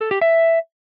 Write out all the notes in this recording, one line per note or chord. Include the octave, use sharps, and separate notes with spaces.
A4
G4
E5